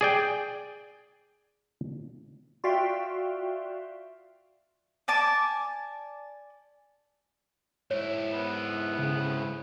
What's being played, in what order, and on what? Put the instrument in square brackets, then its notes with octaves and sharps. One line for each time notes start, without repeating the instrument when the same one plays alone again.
[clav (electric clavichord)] G#4 D5 G5
[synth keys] F4 F#4 D5 E5 F5 G5
[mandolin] D5 G#5 A5 D6
[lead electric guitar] G#2 E4 [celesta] C#5
[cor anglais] B3
[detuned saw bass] C#3